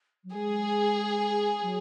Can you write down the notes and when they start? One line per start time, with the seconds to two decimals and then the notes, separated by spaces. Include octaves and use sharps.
0.24 F#3
0.34 G#3 G#4
1.62 F#3